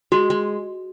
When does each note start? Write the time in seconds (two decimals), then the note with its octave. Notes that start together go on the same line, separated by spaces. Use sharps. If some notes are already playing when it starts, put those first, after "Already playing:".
0.12 G#3 F#4
0.30 G#3